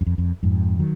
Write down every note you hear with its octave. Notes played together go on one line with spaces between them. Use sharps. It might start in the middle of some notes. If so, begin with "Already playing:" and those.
F#2
F2
F2
F2 G#2
D#3 F#3